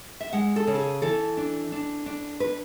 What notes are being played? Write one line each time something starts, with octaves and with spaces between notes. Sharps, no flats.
E5
G#3 F#5
A4
C#3
A4
G#4
E3 A4
D4
D4
D4
B4